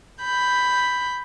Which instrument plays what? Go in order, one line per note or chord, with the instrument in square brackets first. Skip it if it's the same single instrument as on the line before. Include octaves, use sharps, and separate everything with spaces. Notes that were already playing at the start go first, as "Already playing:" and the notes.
[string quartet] B5 G6